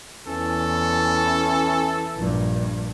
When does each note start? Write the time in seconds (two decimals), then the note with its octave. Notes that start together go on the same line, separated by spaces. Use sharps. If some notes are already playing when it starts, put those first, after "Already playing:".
0.27 E2 E3 C#4 A4
2.16 A#1 G2